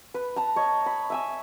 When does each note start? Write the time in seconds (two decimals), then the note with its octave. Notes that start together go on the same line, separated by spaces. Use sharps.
0.14 B4
0.36 A5 A#5
0.56 C#5 D#5
0.86 B5
1.10 E5 G#5 E6